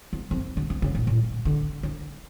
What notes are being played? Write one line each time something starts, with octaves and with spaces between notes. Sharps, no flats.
E2
F2
D3
D3
C#3
A#2
A2
D3
D3